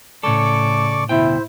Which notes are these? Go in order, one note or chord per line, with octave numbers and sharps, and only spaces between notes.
A2 C#3 A4 D5 C#6 D6
D2 B2 E4 C5 G5